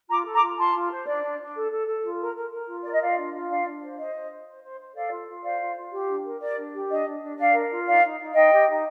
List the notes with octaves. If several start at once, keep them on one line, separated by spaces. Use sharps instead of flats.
F4 A#5 D6
A4
A#5 D6
F4
F4 A5 C6
F4
C5
D4 D5
D4
D4
A4
A4
A4
F4
A#4
A#4
A#4
F4
A#4 D5
D#5
F4 D5 F5
D4
F4
D4 D5 F5
D4
C5
C5 D#5
C5
C5
C5
C5
C5
A4 D5 F5
F4
F4
C5 D5 F5
F4
F4
G4
D4
A#4
A#4 D5
D4
G4
D4 D#5
D4
D4
D4 D5 F5
A#4
F4
D#4 D5 F5
D#4
D#4
D#4 D#5 G5
G4
D#4